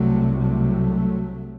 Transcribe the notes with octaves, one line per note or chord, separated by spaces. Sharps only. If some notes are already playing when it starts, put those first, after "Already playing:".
Already playing: C2 C3 F#3 A3
F#3 A3